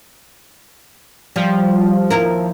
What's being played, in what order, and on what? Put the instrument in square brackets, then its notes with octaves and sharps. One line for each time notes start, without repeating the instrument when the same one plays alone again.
[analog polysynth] F3 [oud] G3
[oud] D#2 E4 A#4